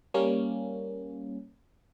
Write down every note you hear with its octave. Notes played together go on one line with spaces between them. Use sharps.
G3 A#3 C#4